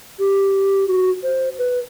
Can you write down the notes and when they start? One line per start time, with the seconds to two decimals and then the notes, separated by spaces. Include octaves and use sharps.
0.19 G4
0.88 F#4
1.23 C5
1.58 B4